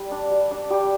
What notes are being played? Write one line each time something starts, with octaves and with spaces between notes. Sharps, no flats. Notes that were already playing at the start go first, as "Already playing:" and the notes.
Already playing: G3
D4
G3
D4
G3 G4